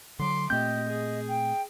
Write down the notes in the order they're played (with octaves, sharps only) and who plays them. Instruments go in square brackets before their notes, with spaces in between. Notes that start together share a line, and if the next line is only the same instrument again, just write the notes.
[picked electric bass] D3 F#3 [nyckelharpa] C6 D6
[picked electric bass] A#2 A3 C4 [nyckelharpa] G4 [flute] D#5 [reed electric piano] G6
[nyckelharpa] G#4
[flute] G5